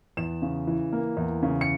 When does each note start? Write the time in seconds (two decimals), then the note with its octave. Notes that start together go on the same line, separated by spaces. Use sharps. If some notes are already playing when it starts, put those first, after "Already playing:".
0.17 E2 E7
0.42 C#3
0.67 E3
0.92 A#3
1.17 E2
1.43 C#3
1.61 C#7